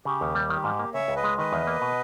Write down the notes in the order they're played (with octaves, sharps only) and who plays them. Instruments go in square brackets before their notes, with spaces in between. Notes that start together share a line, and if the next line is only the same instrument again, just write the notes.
[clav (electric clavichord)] C#3 [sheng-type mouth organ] G4
[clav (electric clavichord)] D#2
G3
[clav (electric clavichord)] D#3 [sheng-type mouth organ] G4
[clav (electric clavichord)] G#2
A#3
[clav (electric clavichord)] C#3 [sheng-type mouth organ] C#5 E5
[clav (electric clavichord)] C#2
[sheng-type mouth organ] B4 D#5
[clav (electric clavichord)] G#3
[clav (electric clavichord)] D#3 [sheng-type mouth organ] B4 D#5
[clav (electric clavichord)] E2
A#3
B2